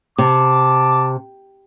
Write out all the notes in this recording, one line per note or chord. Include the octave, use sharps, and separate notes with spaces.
C3 A5 D6